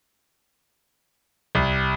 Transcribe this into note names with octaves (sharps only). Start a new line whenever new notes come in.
C2